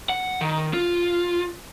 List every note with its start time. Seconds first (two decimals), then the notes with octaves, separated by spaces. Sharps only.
0.09 F#5
0.41 D#3
0.73 F4